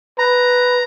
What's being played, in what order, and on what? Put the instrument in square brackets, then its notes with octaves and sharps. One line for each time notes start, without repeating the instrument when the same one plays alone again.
[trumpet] B4 [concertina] A#5